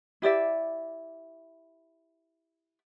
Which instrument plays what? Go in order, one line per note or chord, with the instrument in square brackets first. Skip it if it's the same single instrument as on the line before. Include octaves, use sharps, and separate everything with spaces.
[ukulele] E4 G4 D5 E5